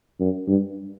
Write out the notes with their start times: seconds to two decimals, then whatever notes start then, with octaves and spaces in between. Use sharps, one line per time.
0.20 F#2
0.48 G2